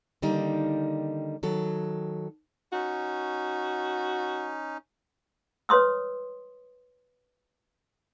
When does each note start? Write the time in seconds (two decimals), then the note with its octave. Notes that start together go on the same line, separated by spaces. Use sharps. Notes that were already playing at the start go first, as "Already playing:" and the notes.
0.22 D3 D#3 G3 A#3 D#4
1.43 D#3 F#3 A4
2.73 C#4 D#4 F#4
5.69 B4 C#5 C6 D#6 E6